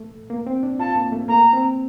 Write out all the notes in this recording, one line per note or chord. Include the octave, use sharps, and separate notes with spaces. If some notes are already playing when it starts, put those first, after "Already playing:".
Already playing: A3
A#3
C4
D4
F4 A5
A#3
A3
A#3 A#5
C4